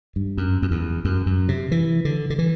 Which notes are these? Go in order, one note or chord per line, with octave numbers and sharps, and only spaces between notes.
G2
F#2
F#2
E2
F#2
F#2
C3
E3
D3
D3
E3